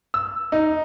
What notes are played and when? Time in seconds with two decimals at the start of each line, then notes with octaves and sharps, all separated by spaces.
0.14 E6
0.52 D#4